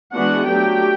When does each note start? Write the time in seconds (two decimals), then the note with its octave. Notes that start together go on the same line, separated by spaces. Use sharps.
0.14 E3 G#3 B3 D4 F#4 F#5
0.47 F#3 A3 D4 G4 G5